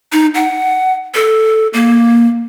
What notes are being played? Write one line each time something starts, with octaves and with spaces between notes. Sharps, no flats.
D#4
F#5
A4
A#3